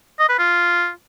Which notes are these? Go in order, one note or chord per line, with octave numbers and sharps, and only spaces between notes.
D#5
B4
F4